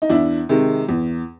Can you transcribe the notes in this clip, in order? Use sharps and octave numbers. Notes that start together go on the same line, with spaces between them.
D#4
E2 D4 E4
C3 D#3 G#3
E2